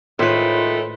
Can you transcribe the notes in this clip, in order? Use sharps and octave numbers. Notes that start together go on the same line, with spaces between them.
A2 D#3 G#3 A3 F4 B4 C5